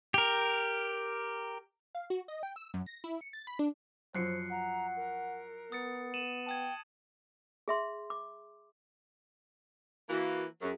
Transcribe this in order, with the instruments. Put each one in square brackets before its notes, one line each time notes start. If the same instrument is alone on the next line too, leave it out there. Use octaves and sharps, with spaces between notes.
[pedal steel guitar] G4 A#4
[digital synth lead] F5
F#4
D#5
G5
E6
F#2
A#6
E4
C#7
A6
B5
D4
[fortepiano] F#2 F3 [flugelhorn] C5 [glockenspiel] F#6 C7 C#7
[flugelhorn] F#5 [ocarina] A#5
[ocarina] A#4
[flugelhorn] B3 [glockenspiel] D#6 A6 C#7
[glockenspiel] D#7 E7 F#7
[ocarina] G5 [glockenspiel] A5 D#6 G#6
[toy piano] G#4 E5 C6
D6
[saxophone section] E3 A#3 [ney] F#4
[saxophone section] F#2 [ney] G#4